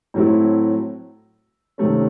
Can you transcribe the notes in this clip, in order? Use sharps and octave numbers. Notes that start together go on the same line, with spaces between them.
A2 F#3 A3 C4 E4
C3 D#3 F#3 A3 C#4